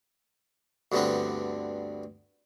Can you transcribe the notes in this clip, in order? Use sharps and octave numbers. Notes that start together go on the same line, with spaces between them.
D2 G2 D3 B3 C4 D4